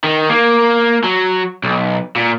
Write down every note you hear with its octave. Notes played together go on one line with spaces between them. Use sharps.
D#3
A#3
F#3
B1
A#2